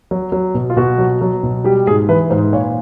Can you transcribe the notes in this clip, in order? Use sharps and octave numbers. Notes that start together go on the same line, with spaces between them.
F#3
F#3
B2
F4
B2 F#4
F#3
F#3
B2
G3 G4
G#2 G#4
E3 B4
G#2 C5
A#2 C#5